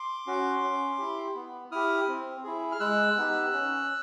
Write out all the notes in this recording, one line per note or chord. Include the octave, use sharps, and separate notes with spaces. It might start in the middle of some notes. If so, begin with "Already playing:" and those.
Already playing: C6 D6
C#4 F#4
C#4
E4 G4
B3
E4 G4 D#6 F6
C4
E4 G#4
F6
G#3 E6 F#6
B3 D#4 G4
C#4